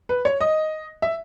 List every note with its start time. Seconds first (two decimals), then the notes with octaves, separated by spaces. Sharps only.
0.09 B4
0.25 C#5
0.41 D#5
1.02 E5